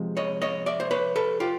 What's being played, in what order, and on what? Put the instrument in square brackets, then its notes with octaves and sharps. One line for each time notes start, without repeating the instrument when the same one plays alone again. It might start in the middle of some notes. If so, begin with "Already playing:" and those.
Already playing: [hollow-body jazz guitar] C3 F3 G#3
C#5 D#5
C#5 D#5
D5 E5
C5
B4 C#5
A4 B4
F4 G4